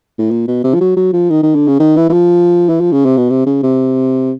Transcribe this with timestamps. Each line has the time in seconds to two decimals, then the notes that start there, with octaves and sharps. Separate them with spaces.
0.19 A2
0.31 A#2
0.47 B2
0.64 C3
0.74 F3
0.81 F#3
0.97 F#3
1.13 F3
1.30 D#3
1.43 D#3
1.55 D3
1.68 C#3
1.80 D#3
1.97 E3
2.09 E3
2.13 F3
2.69 E3
2.80 F3
2.92 C#3
3.05 C3
3.17 B2
3.30 C3
3.46 C#3
3.63 C3